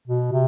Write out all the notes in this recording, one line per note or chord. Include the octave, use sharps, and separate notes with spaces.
B2
C3